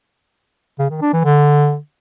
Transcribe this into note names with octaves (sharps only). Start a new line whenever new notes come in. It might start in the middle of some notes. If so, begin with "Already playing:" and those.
C#3
D#3
D4
E3
D3